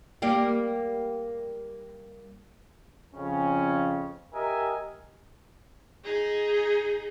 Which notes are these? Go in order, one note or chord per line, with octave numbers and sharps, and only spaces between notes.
G3 A#3 G4
F2 C#3 C#4
G4 A#4 D#5 E5 G#5
D#4 G#4